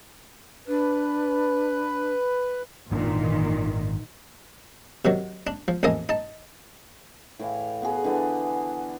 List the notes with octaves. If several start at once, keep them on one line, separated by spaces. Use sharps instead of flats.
D4 B4
G#1 F#2 A#2 D#3 E3 D4
C3 D#3 F#3
D4
F3
A1 F2 A#3 A4 D#5 G#5
D#4 A5
A2 E3 F5
B3 F#4 G#4
D3 E3 B3 D4